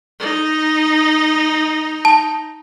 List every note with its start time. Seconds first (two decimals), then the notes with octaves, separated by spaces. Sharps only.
0.19 D#4
2.05 A5